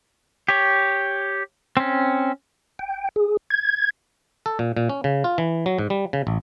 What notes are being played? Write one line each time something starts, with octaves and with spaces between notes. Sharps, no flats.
G4 C#5
C4 C#4
G5
G#4
G#6
A4
A#2
A#2
C#4
C#3
F4
E3
F#3
G#2
G3
C#3
A1